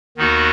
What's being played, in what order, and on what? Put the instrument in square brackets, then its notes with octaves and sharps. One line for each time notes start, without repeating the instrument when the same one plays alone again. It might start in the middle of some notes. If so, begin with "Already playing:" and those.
[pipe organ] D#2 D#3 B3 D#4 F#4